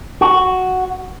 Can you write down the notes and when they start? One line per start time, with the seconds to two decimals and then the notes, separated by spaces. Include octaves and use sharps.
0.21 F#4